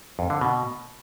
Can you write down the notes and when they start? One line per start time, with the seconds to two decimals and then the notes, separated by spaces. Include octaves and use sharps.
0.19 F2
0.30 D3
0.41 B2